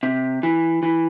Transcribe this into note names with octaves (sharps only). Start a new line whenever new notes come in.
C3
E3
E3